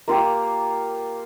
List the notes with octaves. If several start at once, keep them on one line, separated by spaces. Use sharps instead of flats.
A#3 F4 G4